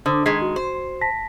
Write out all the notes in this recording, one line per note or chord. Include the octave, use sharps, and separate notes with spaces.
D3 C5 D6 D#6
D#3 G#3 G#6 B6 C7
F#4
C5
A5 A#6 B6